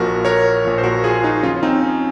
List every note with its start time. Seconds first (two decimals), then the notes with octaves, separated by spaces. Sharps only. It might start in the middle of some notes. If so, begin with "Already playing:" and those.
Already playing: A#1 A#2 F3 F#4 A#4
0.25 A#4 C#5
0.65 A#1 A#2 F3
0.78 C5
0.84 F#4 A#4
1.04 F4 G#4
1.23 D#4 F#4
1.43 D#2 C#3 F3 C#4 F4
1.56 C#4
1.63 C4 D#4
1.83 C#4